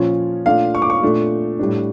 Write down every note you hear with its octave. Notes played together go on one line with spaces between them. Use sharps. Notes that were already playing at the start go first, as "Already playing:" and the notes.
Already playing: A#2 F3 C#4
A#2 A3 D4 F5
C#6
D6
C#6
A#2 A3 D4
A2 G3 D4